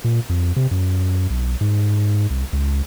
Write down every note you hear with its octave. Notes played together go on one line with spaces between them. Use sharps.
A#2
F2
C3
F#2
B1
G#2
C2
C#2